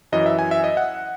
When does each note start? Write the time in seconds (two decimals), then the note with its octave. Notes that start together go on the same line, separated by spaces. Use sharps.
0.12 F#2 E3 D#5
0.26 E5
0.39 G#5
0.51 E5
0.64 D#5
0.77 F#5